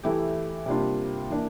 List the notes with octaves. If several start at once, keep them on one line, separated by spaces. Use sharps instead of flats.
E3 A3 E4 G4
C3 G3 A#3 D4 F4
E3 A#3 D4